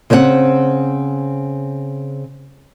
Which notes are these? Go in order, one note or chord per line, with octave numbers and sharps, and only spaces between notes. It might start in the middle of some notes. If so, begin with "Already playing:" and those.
C#3 C4 C5 D#5 F#5